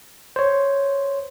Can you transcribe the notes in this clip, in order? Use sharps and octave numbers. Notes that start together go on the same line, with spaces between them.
C5 C#5